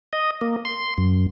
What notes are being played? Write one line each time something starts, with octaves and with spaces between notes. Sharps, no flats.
D#5
A#3
C6
F#2